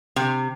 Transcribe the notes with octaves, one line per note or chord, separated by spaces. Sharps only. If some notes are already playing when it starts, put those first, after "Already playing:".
C3